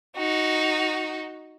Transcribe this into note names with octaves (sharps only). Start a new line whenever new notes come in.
D#4 F#4